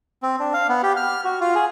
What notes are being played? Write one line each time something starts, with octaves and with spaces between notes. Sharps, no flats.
C4
D4
F5
B3
G4
F6
F#4
F4
G#4